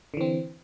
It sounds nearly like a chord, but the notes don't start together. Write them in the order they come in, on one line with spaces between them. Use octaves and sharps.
D3 E3 C4